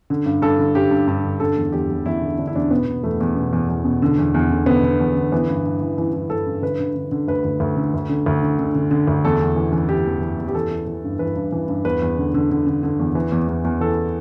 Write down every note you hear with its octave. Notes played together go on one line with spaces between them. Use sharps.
D3
G2
G2 A4
D3
G2 G4
G2
G2
D3
D3 A4
E2
E2 G4
E2
E2 E4
D3
D3 D4
E4
E2 D4
B2 B3
B2
E2 A3
E2
B2
E2
E2
B2
D3
E2
E2
D3
D3 B3
D3
E2
D3
E3 B3
G2
G2
E3
E3 E4
E3
E3 A4
G2
D3 B4
D3
D3
D3
D2 B4
D2
D2
D3
D2
D3
D2
D3
D3
D3
D3
D2
E2 A4
E2
E3
E3
E3 G4
E2
E3
E2
G4
E3 A4
E3
E3
G2
E3 B4
G2
E3
G2
E2 B4
E2
D3
D3
D3
D3
D3
E2
E3
E2
E2
E2
E3 A4